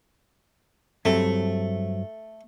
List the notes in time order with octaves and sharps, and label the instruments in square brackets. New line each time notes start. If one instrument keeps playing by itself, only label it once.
[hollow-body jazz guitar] G2 F#3 C4 [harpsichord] A3